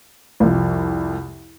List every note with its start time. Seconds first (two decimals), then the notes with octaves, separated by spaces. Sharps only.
0.40 C2 F2